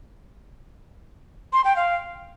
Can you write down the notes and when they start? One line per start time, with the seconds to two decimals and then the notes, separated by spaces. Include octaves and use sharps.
1.53 C6
1.65 G5
1.76 F5